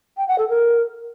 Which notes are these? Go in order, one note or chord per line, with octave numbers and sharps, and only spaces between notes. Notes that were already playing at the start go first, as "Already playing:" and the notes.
G5
F#5
A4
A#4